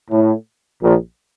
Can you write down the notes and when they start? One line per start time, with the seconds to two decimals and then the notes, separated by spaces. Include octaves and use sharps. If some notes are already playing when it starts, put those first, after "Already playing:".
0.11 A2
0.83 A#1 A#2